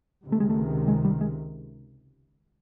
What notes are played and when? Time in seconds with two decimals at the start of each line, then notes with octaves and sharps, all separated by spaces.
0.24 C#2 C3 D#3
0.32 A3
0.40 G#3
0.50 A3
0.88 G#3
1.05 G3
1.21 G#3